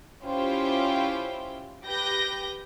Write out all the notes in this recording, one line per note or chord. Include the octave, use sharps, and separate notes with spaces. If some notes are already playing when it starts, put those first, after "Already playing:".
C#4 E4 F4 G4 C5 G5
G4 B4 G6 A#6